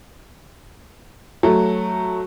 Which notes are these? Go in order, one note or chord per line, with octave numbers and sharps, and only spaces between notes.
F#3 A3